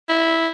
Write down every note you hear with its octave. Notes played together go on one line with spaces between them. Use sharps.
E4